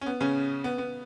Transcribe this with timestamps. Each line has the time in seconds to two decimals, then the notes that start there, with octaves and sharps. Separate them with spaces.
0.01 C#4
0.06 B3
0.21 C#3 C#4
0.64 B3
0.78 B3